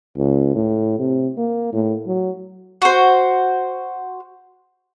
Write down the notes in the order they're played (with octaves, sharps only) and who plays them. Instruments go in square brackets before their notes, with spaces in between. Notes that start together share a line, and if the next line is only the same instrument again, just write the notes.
[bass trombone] C#2
A2
C3
A#3
A2
F#3
[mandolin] F#4 C5